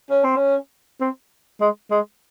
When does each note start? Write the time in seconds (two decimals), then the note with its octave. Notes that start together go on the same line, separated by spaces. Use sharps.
0.10 C#4
0.24 C4
0.37 C#4
1.01 C4
1.61 G#3
1.91 G#3